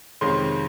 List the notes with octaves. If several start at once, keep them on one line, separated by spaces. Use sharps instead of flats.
F2 C3 D#3 G#3 C#4 C6